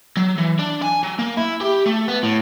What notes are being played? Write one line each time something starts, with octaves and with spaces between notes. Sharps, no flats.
F#3
E3
D4
G#5
F#3
A#3
E4
G4
A3
B3
A2